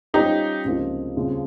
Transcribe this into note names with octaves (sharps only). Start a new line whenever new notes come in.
G3 C#4 D#4 F4 G4 C5 D#5
C#2 C3 F3 A#3 D#4
D#2 C#3 G3 C4 F4